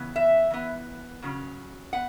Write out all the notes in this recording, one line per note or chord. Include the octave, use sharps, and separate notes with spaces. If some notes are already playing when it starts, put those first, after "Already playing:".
Already playing: C#3 E3 B3
E5
E3 B3
C#3 F#3 C#4
B3 F#5